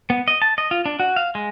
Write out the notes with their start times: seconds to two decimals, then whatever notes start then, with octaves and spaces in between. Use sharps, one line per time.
0.10 B3
0.28 D#5
0.42 A5
0.58 D#5
0.71 F4
0.86 D4
1.00 F#4
1.16 F5
1.35 G#3